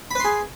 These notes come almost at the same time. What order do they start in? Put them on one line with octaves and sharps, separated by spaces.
B5 B4 C6 G#4